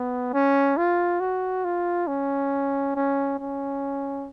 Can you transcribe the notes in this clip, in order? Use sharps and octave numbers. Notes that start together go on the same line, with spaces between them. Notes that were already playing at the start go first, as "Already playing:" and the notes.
Already playing: B3
C#4
F4
F#4
F4
C#4
C#4
C#4